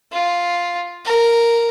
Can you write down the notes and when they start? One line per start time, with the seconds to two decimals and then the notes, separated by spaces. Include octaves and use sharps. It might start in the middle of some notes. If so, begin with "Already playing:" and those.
0.12 F4
1.05 A#4